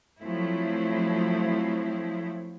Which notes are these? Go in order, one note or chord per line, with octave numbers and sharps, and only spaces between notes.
F3 F#3 A3 C4 E4